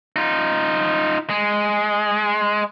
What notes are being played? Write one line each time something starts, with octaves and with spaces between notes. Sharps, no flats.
D#4 F4
G#3